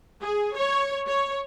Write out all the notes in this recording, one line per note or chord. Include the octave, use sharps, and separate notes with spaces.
G#4
C#5
C#5